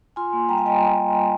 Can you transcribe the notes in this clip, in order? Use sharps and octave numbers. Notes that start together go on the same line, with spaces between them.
F4 G#5 C6
A#3
G3 G5 A#5
F5 G#5
G3 D#5 G5